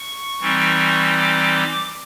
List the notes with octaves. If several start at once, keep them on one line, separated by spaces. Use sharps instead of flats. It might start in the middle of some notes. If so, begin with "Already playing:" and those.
Already playing: C#6
E3 G3 C4 D#4
D6